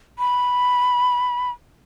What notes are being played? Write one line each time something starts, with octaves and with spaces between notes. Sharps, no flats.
B5